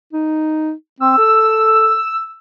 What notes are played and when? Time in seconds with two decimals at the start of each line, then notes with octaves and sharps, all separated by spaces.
0.13 D#4
1.00 C4 E6
1.18 A4